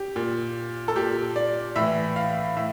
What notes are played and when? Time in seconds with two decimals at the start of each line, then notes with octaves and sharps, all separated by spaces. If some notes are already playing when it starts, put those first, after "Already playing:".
Already playing: G4
0.16 A#2
0.88 A4
0.96 A#2 G4
1.36 D5
1.76 A2 E3 E5
2.16 F5
2.56 A2 E5